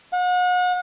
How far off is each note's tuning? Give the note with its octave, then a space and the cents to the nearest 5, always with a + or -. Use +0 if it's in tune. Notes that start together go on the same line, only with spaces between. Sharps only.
F#5 -40